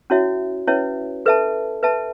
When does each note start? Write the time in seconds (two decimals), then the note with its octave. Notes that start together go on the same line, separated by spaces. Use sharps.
0.10 C#4 E4 F#4 C#5 E5
0.67 C#4 E4 B4 C#5 E5
1.26 A4 B4 E5 A5
1.83 B4 E5 A5